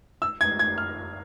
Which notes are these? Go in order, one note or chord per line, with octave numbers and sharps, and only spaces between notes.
E6
G#6
G#6
F6